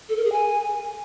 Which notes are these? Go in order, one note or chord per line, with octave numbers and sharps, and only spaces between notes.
A4
A#4
G#4
G#5